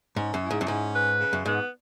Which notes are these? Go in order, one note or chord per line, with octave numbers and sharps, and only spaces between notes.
G#2 C#4
F#2
E4
G#2
F#2
G#2 C#4
B4
C#3
F#2
G#2 B3